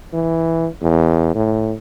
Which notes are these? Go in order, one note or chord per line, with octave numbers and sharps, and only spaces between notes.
E3
E2
A2